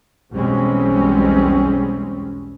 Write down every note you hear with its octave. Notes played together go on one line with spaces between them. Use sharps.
B1 E2 G3 G#3 C4 C#4